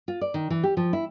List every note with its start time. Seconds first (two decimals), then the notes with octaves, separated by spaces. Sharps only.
0.08 F4
0.21 D5
0.34 D#3
0.50 E3
0.63 G4
0.77 F3
0.93 E4